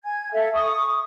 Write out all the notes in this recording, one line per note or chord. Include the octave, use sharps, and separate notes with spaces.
G#5 G#6
A4 E5 F5
C#6 D#6